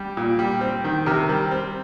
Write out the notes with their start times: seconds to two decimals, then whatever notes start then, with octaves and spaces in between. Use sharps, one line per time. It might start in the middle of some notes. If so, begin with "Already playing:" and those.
Already playing: G3
0.17 A#2
0.39 G3
0.61 C4
0.84 D#3
1.06 C3 G4 A#4
1.29 G3
1.51 C4